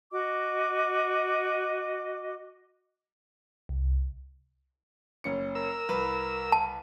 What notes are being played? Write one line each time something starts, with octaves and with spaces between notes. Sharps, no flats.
F#4 D#5 D6
C2
F#1 C#4 C#7
A#4 E6
C2 B4
A5